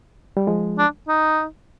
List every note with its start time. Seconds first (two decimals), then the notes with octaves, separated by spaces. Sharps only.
0.37 G3
0.47 F3 G#3
0.78 D4
1.08 D#4